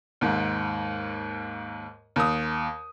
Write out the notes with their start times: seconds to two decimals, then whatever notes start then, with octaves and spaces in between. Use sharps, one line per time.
0.21 D#2 G#2
2.16 D#2 D#6